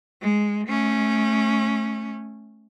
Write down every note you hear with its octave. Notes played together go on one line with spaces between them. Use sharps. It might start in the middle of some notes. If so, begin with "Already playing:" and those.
G#3
A3 C#4